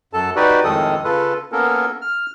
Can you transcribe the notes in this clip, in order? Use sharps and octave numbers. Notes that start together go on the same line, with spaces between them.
F#2 A4 A5
D#4 F#4 G4 B4 D5
F2 A2 D#3 G#3 A4 D#6
C#3 F4 A4 B4
A#3 B3 C#4 A4 A#4
F6